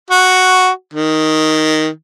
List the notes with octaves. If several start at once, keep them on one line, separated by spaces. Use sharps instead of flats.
F#4
D#3